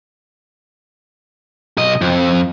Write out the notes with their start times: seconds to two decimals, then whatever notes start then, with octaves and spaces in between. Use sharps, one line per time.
1.78 B1 D#5
2.01 F2